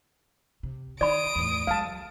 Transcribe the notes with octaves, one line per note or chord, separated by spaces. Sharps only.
C3
D#3 D5 B5 D#6 D7
E2 A2
F#3 G#3 F5 A5